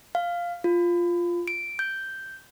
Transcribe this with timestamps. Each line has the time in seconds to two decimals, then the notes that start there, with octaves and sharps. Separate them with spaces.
0.15 F5
0.64 F4
1.48 D7
1.79 G6